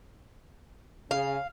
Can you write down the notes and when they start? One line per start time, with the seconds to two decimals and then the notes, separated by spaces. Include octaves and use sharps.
1.11 C#3 F5